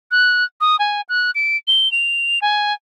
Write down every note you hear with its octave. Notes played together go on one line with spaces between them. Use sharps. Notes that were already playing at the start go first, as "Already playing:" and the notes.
F#6
D#6
G#5
F#6
D7
G7
F7
G#5